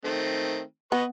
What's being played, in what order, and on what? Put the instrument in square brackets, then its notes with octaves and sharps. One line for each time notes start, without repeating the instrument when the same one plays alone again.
[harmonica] D#3 A3 C4
[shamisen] B3 [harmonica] B4 D#5 C#6